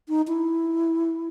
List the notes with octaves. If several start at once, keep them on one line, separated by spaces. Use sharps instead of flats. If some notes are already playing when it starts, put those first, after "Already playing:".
D#4
E4